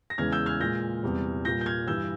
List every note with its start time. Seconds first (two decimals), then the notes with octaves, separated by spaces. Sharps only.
0.10 A#6
0.18 E2 C#3 E3 G#3 F6 G#6
0.32 E6 G6
0.46 F6 G#6
0.60 A#2 G#3 G6 A#6
1.03 E2 C3 G3
1.45 A#2 G3 G6 A#6
1.61 G6
1.66 F6 G#6
1.87 G2 E3 G3 E6 G6